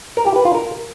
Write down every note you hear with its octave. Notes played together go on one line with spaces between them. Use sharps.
A#4
G4
B4
F4
A#4